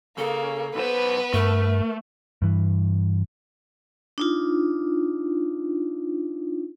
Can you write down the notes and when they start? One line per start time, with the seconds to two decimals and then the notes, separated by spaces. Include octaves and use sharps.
0.18 C#3 A#3 A4
0.75 B1 B3 B4 C5
1.34 G2 A3 A#4
2.42 G2 E3
4.18 D4 D#4 F4